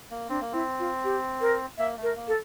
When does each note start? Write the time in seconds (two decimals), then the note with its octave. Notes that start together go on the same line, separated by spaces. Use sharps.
0.11 A#3
0.29 C4 D4
0.41 A#3
0.52 C4 E4
0.79 F4
1.04 G4
1.41 A#4
1.78 A#3 E5
1.97 A3
2.03 A#4
2.16 A#3
2.28 A4